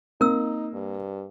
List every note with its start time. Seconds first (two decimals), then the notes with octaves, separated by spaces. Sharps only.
0.21 A#3 C4 D#4 A#4 E6
0.73 G2